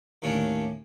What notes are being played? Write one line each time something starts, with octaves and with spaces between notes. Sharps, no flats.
D#2 A2 C#4 D4